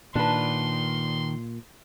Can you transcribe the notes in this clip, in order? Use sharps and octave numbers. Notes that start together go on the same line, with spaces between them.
A#2 D#3 D4 B4 C6